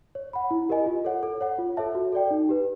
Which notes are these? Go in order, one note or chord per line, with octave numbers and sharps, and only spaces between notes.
C#5
F#5 B5
E4
G4 A#4 D#5 G#5
F4
A4 C#5 F#5
A4
C#5 F#5
F4
A4 C#5 E5 A5
F#4
A4 D5 G5
D#4
G4 B4